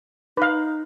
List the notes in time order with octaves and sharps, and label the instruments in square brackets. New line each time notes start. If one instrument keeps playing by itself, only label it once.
[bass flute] D#4 [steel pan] B4 F5